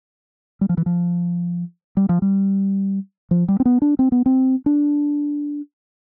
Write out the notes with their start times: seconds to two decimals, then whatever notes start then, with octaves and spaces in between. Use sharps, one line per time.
0.61 G3
0.69 F3
0.78 E3
0.86 F3
1.97 G3
2.09 F3
2.22 G3
3.31 F3
3.48 G3
3.60 C4
3.65 B3
3.82 D4
3.99 C4
4.12 B3
4.26 C4
4.66 D4